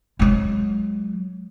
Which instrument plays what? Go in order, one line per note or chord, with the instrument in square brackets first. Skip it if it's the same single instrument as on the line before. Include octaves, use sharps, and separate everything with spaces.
[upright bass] F#3 G#3